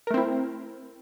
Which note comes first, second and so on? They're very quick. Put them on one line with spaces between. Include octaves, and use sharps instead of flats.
A#4 A3 C4 E4